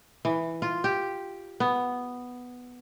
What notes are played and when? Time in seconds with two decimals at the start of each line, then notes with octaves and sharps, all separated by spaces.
0.25 E3
0.62 F4
0.84 G4
1.60 B3